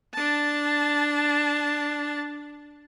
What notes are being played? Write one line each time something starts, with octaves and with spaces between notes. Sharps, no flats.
D4 A5